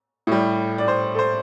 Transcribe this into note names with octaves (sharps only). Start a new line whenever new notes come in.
A2 G3
D5
C5
A4
C5